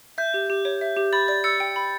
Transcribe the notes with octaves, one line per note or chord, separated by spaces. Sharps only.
E5 G6
G4
G4
C#5
E5
G4
B5 A6
D5 A6
E6 A6 C#7
G5
B5